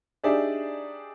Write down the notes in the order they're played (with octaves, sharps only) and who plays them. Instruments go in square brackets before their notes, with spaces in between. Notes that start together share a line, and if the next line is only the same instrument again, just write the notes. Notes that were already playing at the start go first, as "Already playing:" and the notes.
[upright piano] D4 D#4 G4 G#4 D5 E5